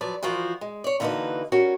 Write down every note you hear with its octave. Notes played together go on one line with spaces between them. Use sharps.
F3 F#3 B4 D5
E3 F3 F4 F#4 A#4 C5
G#3
C#5 D5
D3 E3 A#3 D#4 F#4 B4
G3 C#4 F#4 A#4